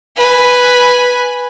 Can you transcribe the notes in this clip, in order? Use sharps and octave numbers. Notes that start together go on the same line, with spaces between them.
B4 G#5